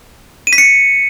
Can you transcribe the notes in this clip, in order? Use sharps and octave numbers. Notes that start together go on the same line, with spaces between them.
D#7
B6
C#7